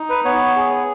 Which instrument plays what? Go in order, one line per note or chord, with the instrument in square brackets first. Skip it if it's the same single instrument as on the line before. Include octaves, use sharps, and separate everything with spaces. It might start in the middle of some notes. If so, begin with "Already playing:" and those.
Already playing: [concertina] D#4
B4
B3 C#5
G#4